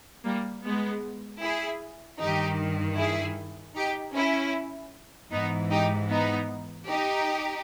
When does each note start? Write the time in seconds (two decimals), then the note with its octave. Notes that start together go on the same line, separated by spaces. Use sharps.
0.25 G3 A#3
0.64 G#3 B3
1.42 E4 G#4
2.20 G2 D#3 D#4 G4
2.98 E4 G#4
3.76 D#4 G4
4.15 C#4 E4
5.32 G#2 E3 B3 D#4
5.71 D#4 G4
6.10 B3 D#4
6.88 D#4 G4